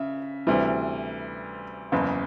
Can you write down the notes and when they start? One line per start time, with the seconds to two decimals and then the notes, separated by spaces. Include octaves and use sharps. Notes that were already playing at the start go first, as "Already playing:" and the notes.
Already playing: C#3 E5
0.47 D2 C3 E3 G3
1.92 F#1 E2 C#3